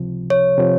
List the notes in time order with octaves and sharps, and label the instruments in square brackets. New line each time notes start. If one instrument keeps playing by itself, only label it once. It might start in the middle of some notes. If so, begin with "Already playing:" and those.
Already playing: [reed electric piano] C#2 C3 F3
[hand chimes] C#5
[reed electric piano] C3 F3